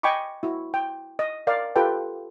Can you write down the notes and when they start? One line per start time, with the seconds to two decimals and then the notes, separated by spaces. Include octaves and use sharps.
0.03 D#5 G5 G#5 B5 C#6 D6
0.43 E4 F#4
0.74 G5
1.19 D#5
1.47 A#4 D5 F5
1.76 F4 G4 A4 B4 G5